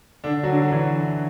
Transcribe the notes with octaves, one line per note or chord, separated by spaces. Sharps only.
D3 D4
F#3 F#4
D3 D4
F#3
E3